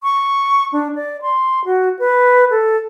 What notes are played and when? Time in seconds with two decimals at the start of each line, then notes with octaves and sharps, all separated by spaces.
0.03 C#6
0.73 D4
0.95 D5
1.22 C6
1.65 F#4
1.99 B4
2.50 A4